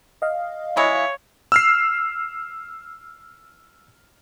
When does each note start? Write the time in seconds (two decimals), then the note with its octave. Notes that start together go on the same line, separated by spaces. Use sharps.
0.22 D#5 F5
0.77 G#3 E4 C#5
1.52 E6 F6 C7